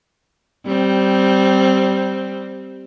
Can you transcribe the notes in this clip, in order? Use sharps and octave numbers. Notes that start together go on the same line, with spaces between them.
G3 C4